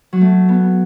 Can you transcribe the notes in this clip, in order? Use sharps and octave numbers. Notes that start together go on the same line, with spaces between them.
F#3
A3
B3